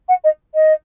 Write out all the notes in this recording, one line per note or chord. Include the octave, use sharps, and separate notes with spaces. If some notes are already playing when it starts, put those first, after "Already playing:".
F#5
D#5
D#5